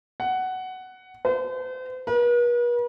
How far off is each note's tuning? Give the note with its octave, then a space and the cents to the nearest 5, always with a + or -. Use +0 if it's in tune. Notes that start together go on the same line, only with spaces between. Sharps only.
F#5 +10
C5 -40
B4 -45